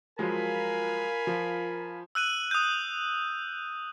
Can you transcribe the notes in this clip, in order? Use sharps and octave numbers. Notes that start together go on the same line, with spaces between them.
F3 F#3 G#3 F4 A#4 F5 G#5 B5
F3
E6 F#6 D#7 F#7
D#6 G6